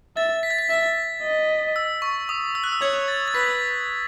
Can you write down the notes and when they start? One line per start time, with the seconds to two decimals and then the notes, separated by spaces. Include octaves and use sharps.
0.17 E5 A6
0.43 B6
0.51 A6
0.58 B6
0.70 E5 B6
1.23 D#5
1.76 E6
2.02 C#6
2.29 D#6
2.55 E6
2.64 F#6
2.72 E6
2.81 C#5 G#6
3.08 A6
3.28 A6
3.34 B4 B6